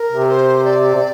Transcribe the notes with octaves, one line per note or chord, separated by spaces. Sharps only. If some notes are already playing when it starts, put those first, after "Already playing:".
Already playing: A#4
C3
C5
D5
C3